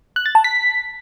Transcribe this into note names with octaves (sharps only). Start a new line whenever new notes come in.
F#6
A6
A5
B6